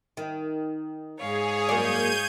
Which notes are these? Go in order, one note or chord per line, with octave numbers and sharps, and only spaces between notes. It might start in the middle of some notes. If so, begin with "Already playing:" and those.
D#3
G#2 G#4 C#5 F5
F#2 A#3 D5 G6 G#6 D#7